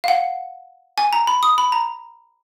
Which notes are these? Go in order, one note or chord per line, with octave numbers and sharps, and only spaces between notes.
F5
F#5
G#5
A#5
B5
D#6
B5
A#5